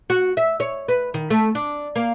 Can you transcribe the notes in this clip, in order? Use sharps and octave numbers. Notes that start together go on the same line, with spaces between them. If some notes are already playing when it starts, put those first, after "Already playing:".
F#4
E5
C#5
B4
D#3
A3
D4
A#3